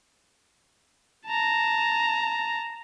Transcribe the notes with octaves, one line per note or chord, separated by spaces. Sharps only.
A5 A#5